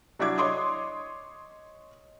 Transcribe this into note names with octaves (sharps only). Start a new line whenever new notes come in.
F#3 D4 E4 F#4 D6 G#6
C#5 D#5 C6 D6 D#6